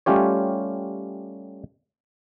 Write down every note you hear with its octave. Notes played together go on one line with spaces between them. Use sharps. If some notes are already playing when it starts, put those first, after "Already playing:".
G3 A3 C#4 F4 G4 C#5